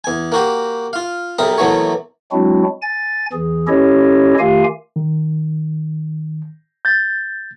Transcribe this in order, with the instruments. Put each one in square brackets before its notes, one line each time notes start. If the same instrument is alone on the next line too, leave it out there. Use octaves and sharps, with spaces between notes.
[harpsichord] E2 G#5
A#3 F#4 G4
F4 F5
B1 G3 A#4 E5 D#6
D#2 B2 E3 F#3 A3 C#5
[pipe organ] F#3 G#3 C4 D4 E4 F#4
G#5 A6
E2 E3 G#4
C#4 E4 G4 A4 C#5 D#5
D#3 A3 F4 G4 F5 G#5
[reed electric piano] D#3
G6 A6